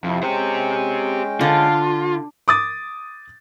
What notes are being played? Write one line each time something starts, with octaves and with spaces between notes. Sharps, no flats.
F2 C3 E4
G#3 C#4 G4 C5 G5
D3 F4
D6 D#6 A6